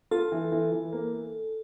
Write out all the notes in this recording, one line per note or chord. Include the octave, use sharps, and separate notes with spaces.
F4 A4
E3
E3
E3
A#3